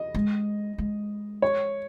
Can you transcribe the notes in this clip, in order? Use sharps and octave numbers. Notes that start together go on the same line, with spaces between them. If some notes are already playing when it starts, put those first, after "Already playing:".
Already playing: D#5
G#3
G#3
C#5